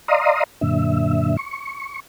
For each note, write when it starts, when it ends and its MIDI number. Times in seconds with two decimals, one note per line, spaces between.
0.08 0.43 74
0.08 0.43 75
0.08 0.43 77
0.08 0.43 82
0.08 0.43 84
0.08 0.43 87
0.61 1.36 42
0.61 1.36 46
0.61 1.36 50
0.61 1.36 76
1.37 2.00 85